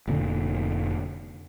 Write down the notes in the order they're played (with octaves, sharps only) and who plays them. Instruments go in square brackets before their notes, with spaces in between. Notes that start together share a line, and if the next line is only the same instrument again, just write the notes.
[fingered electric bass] F1 A#2 D3